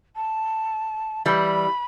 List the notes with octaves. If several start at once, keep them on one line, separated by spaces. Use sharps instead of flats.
A5
E3 G3 B5